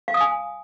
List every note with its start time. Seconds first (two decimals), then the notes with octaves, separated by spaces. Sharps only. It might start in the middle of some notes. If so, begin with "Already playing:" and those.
0.08 F5
0.14 D#6
0.21 G#5